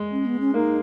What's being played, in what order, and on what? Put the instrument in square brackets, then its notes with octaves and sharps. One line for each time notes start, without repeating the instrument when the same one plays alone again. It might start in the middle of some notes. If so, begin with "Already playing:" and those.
Already playing: [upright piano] G#3
[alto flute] C#4
B3
C#4
[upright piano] A#3 [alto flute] D#4